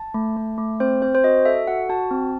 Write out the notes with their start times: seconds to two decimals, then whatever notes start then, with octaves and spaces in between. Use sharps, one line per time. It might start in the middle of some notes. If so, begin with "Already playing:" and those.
Already playing: A5
0.14 A3
0.37 A3
0.58 A3
0.80 C4 C5
1.02 C4 C5
1.15 C5
1.24 F#4 D#5
1.45 A4 E5
1.67 F#4 F#5
1.89 F#4 A5
2.11 C4